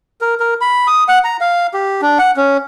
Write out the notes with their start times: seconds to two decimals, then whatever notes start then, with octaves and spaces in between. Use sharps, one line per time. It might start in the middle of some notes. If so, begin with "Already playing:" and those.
0.21 A#4
0.40 A#4
0.61 B5
0.87 D#6
1.08 F#5
1.24 A#5
1.41 F5
1.74 G4
2.02 D4
2.19 F#5
2.37 C#4